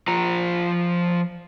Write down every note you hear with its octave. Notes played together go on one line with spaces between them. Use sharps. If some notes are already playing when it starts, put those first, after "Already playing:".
F3 F4 A#5